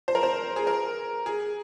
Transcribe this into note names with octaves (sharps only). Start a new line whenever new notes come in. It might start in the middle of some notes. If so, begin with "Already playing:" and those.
C5
A#4
C5
G#4
A#4
G#4